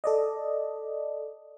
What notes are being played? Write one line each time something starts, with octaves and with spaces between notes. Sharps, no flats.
A4 D5 D#5